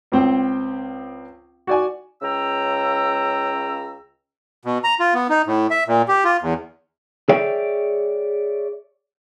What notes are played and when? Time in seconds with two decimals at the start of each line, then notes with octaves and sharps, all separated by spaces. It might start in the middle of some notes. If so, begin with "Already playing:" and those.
0.12 C#2 C4 G5
1.67 F#4 D5 G#5
2.22 C#2 C#3 G5 A#5 E6
4.65 B2
4.84 A#5
5.00 F4
5.14 B3
5.30 D#4
5.46 A2
5.71 E5
5.87 A#2
6.08 G4
6.24 F4
6.42 E2
7.29 G#4 C#5 D5 E5 G5